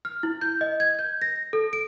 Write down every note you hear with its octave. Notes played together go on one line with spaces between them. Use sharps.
F6
E4
G6
D#5
G#6
G6
A#6
A4
D7